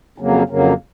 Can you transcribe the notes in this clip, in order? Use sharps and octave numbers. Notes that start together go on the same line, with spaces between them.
F2 C#3 F#3 A#3
F2 C#3 F#3 A#3